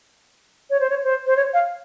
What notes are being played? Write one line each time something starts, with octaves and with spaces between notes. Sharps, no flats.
C#5
C5
C#5
C5
C5
C#5
F5